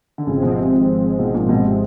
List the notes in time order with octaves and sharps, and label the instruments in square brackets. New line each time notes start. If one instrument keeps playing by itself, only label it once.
[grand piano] D3
[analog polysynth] G#1 G#2 F3 G#3 C4 [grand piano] C#3
[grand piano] B2
C3
B2
A#2
B2
C3